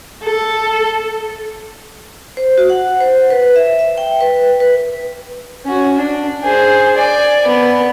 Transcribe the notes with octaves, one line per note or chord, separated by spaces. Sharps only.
A4
C5
F#4
F#5
C5
B4
E5
E5
G5
B4
B4
C#4 F#4
D4
G#4 C5
D5 G#5
B3